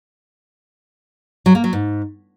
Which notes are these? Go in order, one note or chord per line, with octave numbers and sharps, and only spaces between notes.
F#3
A#3
F#3
G#2